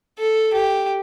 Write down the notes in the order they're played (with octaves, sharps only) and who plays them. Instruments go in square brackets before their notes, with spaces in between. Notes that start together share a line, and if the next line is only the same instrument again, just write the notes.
[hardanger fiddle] A4
G4